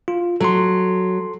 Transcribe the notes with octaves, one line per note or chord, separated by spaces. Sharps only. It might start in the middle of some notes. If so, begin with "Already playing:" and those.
F4
F#3 A4 C6